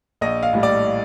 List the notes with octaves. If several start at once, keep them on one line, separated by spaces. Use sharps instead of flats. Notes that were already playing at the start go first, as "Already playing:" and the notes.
A#1 D#5
F5
A2 G3
D5